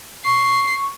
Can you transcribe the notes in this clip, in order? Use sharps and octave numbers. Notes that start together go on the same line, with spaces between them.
C#6 C7